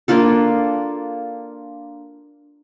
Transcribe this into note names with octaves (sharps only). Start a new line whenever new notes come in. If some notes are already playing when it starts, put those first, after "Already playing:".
A#3 D4 F4 A4